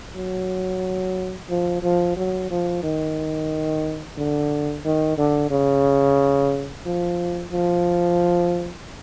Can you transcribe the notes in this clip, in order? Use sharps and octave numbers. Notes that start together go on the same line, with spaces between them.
F#3
F3
F3
F#3
F3
D#3
D3
D#3
D3
C#3
F3
F3